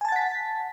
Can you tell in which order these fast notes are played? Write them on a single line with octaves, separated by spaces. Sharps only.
G#5 A5 A6 F#5 B6